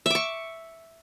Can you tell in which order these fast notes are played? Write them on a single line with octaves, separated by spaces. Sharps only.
E5 D6 C#6